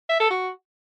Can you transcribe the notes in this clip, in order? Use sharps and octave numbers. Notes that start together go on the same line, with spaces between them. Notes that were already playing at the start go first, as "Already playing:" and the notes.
E5
A4
F#4